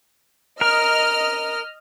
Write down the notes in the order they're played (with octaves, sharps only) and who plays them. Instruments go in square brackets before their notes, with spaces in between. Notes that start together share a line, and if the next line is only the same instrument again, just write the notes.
[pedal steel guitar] A#4 [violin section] D#5 F6